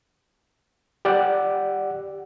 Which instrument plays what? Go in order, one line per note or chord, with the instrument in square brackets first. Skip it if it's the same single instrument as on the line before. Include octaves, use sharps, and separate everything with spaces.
[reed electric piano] G4 D5 F#5